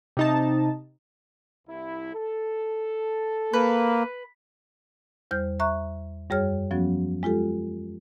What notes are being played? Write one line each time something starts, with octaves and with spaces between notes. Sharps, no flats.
C3 D#4 A5
C2 E4
A4
A#3 B4
E2 G3 C5 F6 G6
E5 A#5 C#6 F#6
F#2 G3 G#4 C#5 F6
F3 F#3 B3 C#4 F#4
G#3 F4 G4 A4